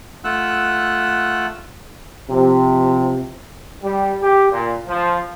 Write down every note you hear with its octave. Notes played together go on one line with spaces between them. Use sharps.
A3 F4 F#5 E6 F#6
C3 F3
G3
G4
A#2
F3